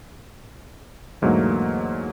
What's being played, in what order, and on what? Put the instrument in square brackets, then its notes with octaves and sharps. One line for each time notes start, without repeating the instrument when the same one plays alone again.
[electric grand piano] E2 G#2 D3 F#3 A3 A#3